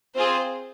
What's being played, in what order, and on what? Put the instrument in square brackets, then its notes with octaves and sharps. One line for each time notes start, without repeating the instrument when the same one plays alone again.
[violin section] C4 F4 G#4 C5